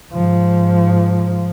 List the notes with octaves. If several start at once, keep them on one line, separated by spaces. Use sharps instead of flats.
G#2 F3